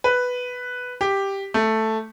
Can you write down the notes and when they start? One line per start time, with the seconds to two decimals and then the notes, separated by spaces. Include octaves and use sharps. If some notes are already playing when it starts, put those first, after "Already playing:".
0.04 B4
1.01 G4
1.54 A3